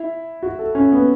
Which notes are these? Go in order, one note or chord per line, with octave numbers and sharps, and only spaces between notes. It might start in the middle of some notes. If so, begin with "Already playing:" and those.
Already playing: E4
F#4
A4
C#4
B3